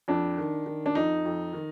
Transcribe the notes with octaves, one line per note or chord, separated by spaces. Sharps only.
F2 D4
D#3
D#3
D4
F2 D#4
F2
D#3